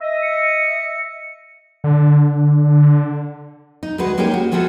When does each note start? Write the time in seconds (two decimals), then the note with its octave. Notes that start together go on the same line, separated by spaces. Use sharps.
0.01 D#5 E5
0.23 C#7
1.84 D3
3.83 D#4
3.98 D2 G#3 F#4 B4
4.18 G#3 A#3 C#4 D#4 G4
4.34 F#4
4.52 F3 G#3 A3 B3 F#4 A4